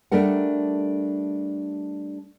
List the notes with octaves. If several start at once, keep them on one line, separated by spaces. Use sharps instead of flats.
G3 A3 D4 A4 A#4 F#5